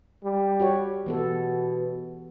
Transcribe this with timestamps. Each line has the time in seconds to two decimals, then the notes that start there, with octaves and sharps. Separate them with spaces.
0.24 G3
0.60 F#4 G4 C#5
1.06 B2 E3 B3 A4